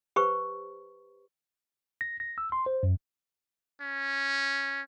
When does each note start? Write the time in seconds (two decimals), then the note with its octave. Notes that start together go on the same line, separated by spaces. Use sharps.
0.16 G4 B4 C5 C#6
2.01 A#6
2.20 A#6
2.38 E6
2.52 C6
2.66 C5
2.83 F#2
3.82 C#4